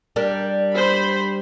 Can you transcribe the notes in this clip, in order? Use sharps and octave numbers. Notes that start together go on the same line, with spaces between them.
G3 D4 A#4
C5 B5